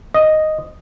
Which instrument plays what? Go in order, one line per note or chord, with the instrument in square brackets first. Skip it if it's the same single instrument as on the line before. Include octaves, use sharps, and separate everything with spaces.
[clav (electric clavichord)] D#5